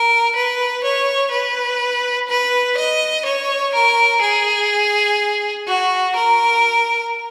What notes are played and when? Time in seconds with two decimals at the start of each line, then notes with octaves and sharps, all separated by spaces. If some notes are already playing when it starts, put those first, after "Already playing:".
Already playing: A#4
0.36 B4
0.84 C#5
1.32 B4
2.29 B4
2.77 D#5
3.26 C#5
3.74 A#4
4.22 G#4
5.67 F#4
6.16 A#4